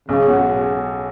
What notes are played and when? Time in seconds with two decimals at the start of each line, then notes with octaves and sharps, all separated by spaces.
0.08 B1 C#3
0.27 B2 G#3 C#4 F#4